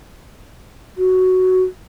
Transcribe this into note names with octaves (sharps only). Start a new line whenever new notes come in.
F#4